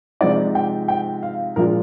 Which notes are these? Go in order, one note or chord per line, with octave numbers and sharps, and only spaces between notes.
C3 F3 G#3 D#4 D5
G5
G5
F5
A#2 F3 G#3 D4 F4 A#4